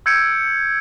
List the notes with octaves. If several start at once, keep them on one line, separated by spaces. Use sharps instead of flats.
E6 G6 G#6 C#7 D7